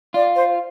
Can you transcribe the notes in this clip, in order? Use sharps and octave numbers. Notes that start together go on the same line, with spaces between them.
F4 D5
C5